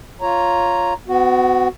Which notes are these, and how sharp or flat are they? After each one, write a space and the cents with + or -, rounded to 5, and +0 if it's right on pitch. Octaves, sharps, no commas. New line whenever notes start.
F4 +0 C#5 +0 A#5 +0
B3 +40 F#4 +0